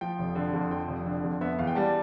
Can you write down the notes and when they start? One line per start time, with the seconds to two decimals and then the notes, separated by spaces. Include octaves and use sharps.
0.01 F3 G5
0.19 F1
0.35 D3
0.53 F2
0.71 F3 G5
0.88 F1
1.06 D3
1.23 F2
1.41 B3 E5
1.59 E2 F5
1.67 G5
1.75 G3 A5